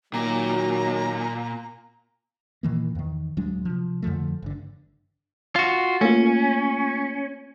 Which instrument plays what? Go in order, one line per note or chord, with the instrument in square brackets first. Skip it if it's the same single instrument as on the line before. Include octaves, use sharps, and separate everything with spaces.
[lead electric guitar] A#2 [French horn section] D#3 F#3 [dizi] A#5
[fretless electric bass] A#2 D#3 E3 A#3
E2 D#3
D1 F#3 G#3 D4
C3 F3
F2 D3 F3 A3
G1 D3
[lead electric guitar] F4 F#4
[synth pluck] A3 A#3 F4 [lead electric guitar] C#4